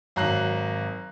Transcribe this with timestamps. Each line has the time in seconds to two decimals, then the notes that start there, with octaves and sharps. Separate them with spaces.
0.16 G#1 F#3 A#5 F#6 C7 F#7